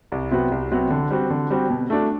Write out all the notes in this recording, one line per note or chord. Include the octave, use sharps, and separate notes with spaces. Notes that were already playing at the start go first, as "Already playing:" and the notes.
C2
C3 F#3 B3 F#4
C2
C3 F#3 B3 F#4
D3
G3 C4 F#4
D3
G3 C4 F#4
B2
A3 D4 F#4